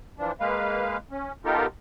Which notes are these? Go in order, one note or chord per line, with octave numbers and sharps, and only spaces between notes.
E3 F3 D4
G#3 A#3 B4 F5
C#4
B3 D#4 F4 G4 A4 A#4